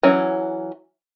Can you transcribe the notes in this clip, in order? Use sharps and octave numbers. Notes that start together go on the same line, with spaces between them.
E3 F#3 C#4